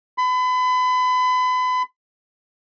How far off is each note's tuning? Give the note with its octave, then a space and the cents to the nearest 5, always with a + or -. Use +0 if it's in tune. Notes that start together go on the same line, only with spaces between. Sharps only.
B5 +35